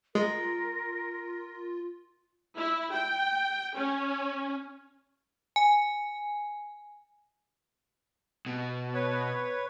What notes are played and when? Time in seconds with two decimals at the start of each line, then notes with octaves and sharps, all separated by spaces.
0.15 G#3 F4 A#4
2.57 E4
2.93 G5
3.77 C#4
5.56 G#5
8.46 B2
8.94 B4 C#5